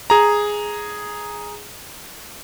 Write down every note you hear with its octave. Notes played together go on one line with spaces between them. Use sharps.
G#4 A#5